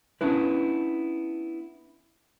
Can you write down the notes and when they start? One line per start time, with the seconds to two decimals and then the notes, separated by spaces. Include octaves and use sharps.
0.21 B3 C#4 D4 E4 B4